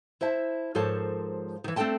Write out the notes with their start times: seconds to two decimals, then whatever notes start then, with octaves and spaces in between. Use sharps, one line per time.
0.21 E4 C5 E5 A5
0.75 G#2 F3 A4 A#4 C#5 A5
1.64 D#3 E3
1.76 A3 C4 D4 A4 G5 A5